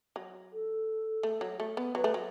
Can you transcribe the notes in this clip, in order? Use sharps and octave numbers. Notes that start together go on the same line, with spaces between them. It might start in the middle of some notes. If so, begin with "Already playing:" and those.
F#3
A4
A3
F#3
A3
B3
F#3 B4
A3
F#3